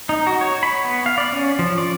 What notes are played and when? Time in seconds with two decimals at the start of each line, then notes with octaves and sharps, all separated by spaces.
0.09 D#4
0.27 F#4
0.41 C#5
0.63 B5
0.84 B3
1.06 F5
1.18 D5
1.32 C#4
1.59 F3
1.78 D5